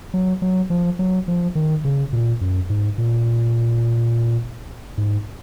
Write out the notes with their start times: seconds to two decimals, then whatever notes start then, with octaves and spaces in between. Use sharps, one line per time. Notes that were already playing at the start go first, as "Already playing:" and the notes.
0.14 F#3
0.42 F#3
0.70 F3
0.99 F#3
1.28 F3
1.55 D#3
1.84 C#3
2.13 A#2
2.41 F#2
2.70 G#2
2.98 A#2
4.98 G#2